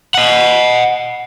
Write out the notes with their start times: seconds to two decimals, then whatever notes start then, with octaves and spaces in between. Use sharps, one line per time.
0.14 D#5 F#5